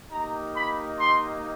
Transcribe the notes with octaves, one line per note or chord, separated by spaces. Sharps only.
A#3 D#4 G4 A#5
B5
C6